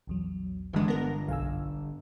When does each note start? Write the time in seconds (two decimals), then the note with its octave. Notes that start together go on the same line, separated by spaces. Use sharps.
0.07 A#1 E2 F#3
0.73 G1 E3 G#3 D4
0.88 B3 A#4 A#6
1.28 B1 F5 G#5 E6
1.47 G2